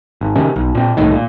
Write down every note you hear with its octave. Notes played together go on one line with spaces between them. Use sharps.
G#1
C3 D#3 C#4
B1
A#2 C4
G1 C2 A2 D#3
A#2